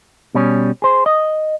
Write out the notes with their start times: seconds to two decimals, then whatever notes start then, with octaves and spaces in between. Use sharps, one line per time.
0.35 B2 G3 C#4
0.82 G#4 C5
1.06 D#5